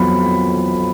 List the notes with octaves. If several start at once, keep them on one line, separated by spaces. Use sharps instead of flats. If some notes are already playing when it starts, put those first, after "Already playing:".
Already playing: F2 F#3 B3 B5